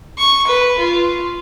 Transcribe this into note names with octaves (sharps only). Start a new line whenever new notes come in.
C#6
B4
F4